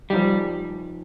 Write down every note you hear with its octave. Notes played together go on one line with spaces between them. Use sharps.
F3 G3 D#4 G4